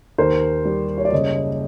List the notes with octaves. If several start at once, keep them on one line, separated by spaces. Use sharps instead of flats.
D#2 A#4 C5
G3
C#5
D5
F#1 C#5 D#5